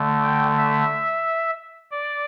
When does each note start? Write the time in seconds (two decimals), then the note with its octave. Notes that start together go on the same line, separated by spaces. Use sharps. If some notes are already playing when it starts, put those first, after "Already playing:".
Already playing: D3 A3
0.23 G5
0.57 E5
1.91 D5